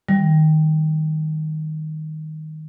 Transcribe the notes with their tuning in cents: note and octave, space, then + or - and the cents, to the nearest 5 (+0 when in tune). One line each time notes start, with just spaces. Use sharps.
D#3 +0 G3 +0